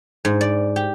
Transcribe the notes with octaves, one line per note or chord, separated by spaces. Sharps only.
G#2
D5
G4